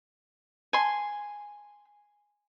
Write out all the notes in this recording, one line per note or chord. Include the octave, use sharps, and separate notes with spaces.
G#5 C6